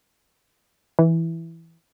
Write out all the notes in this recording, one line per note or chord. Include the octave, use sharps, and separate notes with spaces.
E3